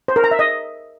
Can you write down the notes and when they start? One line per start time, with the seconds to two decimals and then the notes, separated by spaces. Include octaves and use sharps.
0.08 C5
0.16 A#4
0.24 A#5
0.31 E5
0.39 D#5